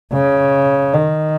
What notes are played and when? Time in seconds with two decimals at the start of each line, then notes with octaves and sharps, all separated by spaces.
0.13 C#3
0.93 D#3